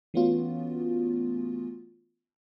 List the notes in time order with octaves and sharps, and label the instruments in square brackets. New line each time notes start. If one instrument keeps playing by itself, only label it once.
[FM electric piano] E3 A3 B3 C#4 F4 F#4